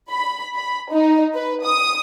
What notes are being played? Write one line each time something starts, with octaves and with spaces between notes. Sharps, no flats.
B5
B5
D#4
B4
D#6